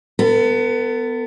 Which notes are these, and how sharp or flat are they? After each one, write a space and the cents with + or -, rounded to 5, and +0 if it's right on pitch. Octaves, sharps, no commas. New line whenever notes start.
B3 +15 A4 +45